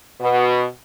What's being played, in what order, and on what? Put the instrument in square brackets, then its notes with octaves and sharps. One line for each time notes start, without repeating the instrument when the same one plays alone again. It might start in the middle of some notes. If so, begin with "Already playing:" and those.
[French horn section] B2